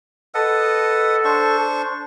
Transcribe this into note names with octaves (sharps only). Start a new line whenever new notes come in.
A4 B4 D#5 F#5
D4 C5 C#6